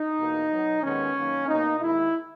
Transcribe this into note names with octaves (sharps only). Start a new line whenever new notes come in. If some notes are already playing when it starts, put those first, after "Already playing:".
Already playing: D#4
E2 B2 A#3
B2 F#3 B3
D#2 D#3 G#3 B3 C#4
F#2 D#3 A#3
B2 A#3 D#4
D#2 D#3 G#3 E4